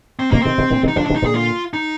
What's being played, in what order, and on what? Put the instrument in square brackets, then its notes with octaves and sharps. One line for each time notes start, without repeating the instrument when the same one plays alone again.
[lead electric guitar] C4
[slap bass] C3 D#3 [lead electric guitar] A#3
[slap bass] C3 D#3 [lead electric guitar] C4
[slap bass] C3 D#3
A#2 D3
C3 D#3
[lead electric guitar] D#4
[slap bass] D3 F3 [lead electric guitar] D4
[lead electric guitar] D4
[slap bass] C3 D#3
[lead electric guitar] D#4
[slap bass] A#2 D3 [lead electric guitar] G#4
[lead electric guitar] F4
D#4